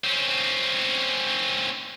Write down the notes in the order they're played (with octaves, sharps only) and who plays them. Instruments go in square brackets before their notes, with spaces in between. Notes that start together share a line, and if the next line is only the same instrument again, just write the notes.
[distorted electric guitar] C4 C#4